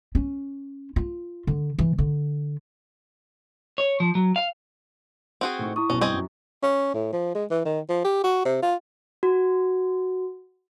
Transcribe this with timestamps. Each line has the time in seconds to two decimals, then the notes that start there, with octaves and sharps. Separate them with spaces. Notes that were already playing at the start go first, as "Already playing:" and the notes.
0.15 C#4
0.96 F4
1.47 D3
1.79 E3
1.98 D3
3.78 C#5
4.00 F3
4.15 F#3
4.36 F5
5.41 C4 F#4 G#4
5.59 A2 D#4 C#6
5.76 E4 C#6 D#6
5.90 B1 B2 C#4
6.01 G2 C4 D#5 G#5
6.14 F#2 F#3
6.63 C#4
6.94 A2
7.13 F3
7.35 G#3
7.51 E3
7.65 D#3
7.89 F3
8.05 G4
8.24 F#4
8.45 C3
8.62 F4
9.23 F#4